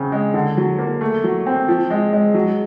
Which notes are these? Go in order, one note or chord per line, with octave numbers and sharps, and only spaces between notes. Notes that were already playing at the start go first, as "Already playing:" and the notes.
Already playing: C#3 C4
G#3
D3
F#3
A#3
A3
F#3
C4
F3
G#3
G#3
F#3